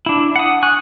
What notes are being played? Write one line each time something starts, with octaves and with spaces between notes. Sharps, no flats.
D4 E4
F#5 D#6
G#5 C#6 F#6